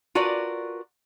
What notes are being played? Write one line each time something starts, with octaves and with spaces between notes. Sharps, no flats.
F4 F#4 A#4 B4 D5